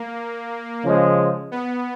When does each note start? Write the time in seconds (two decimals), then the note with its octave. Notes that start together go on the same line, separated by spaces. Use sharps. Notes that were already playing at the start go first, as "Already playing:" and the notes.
Already playing: A#3
0.84 C#3 F3 G#3
1.52 B3